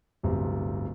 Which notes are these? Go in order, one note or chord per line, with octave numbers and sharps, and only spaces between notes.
D1 G1 C3